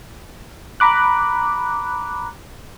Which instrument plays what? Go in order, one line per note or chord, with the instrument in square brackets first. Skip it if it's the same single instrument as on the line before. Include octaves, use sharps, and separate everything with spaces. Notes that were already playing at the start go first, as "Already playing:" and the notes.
[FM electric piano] A#5 B5 D6 F#6